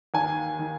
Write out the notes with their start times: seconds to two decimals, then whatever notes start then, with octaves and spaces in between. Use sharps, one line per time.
0.14 D#2 G#5
0.59 D#3